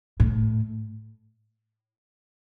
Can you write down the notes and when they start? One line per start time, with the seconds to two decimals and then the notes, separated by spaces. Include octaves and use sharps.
0.20 A2